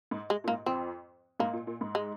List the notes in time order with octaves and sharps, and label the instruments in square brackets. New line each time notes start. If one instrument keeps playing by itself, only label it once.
[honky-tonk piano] G#2
[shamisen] G#3
[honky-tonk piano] A#2
[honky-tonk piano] G#2 [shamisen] A#3
[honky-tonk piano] F2 [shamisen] C4
[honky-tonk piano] G#2 [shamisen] A#3
[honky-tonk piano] A#2
A#2
G#2
[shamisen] G#3